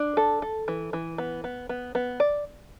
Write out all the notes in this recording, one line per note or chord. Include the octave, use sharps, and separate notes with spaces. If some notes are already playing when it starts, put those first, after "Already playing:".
Already playing: D4
A4
A4
E3
E3
B3
B3
B3
B3
D5